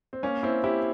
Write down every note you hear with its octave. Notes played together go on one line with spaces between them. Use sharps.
C4
A#3 C#4
C4 E4
E4 G4